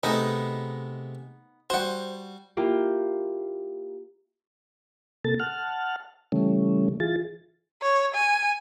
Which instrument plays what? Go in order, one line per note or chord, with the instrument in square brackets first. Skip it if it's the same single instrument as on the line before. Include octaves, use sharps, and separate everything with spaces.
[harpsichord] C3 G#3 A3 [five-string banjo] B3 D#4
[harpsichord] G3 F#4 [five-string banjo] C5 F#5
[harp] A#3 E4 F4 G4
[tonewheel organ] C3 A#3 A4 A6
F#5 A5 F6
C#3 E3 G3 A3 C#4
E3 F4 G#4 A6
[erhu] C#5
G#5